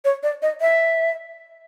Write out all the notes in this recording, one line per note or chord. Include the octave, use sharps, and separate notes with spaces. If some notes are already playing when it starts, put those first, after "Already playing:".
C#5
D5
D#5
E5